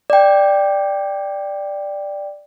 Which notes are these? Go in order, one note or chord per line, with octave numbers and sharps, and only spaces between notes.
D5 G5